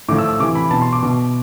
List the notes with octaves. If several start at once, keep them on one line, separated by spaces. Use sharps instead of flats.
A2 F3 D6
E6
E6
C3 E3 D6
B5
B2 A5
C6
D6
B2 D6